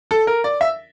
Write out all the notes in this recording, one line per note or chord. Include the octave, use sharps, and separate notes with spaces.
A4
A#4
D5
E5